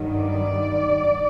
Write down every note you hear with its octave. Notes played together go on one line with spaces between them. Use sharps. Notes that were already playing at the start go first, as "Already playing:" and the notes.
Already playing: G2 D#3 F#3
D5